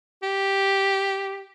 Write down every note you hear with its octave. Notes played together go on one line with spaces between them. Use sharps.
G4